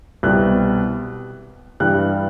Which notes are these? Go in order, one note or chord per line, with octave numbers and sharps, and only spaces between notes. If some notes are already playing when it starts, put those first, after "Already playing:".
C2 B2 G3 F#6
G2 E3 G3 F#6